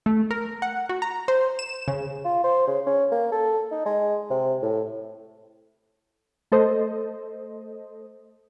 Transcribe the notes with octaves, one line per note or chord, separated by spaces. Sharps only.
A3
A#4
F#5
F#4
A#5
C5
E7
C#3
F4
C5
C#3
C#4
A#3
A4
D#4
G#3
C3
A2
A3 A4 C5 D#5